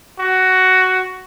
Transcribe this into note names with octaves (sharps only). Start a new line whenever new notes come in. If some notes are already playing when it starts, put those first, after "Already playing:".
F#4